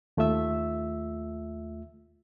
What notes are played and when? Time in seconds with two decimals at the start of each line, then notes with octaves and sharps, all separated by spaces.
0.17 D#2 A3 F4 E5 E6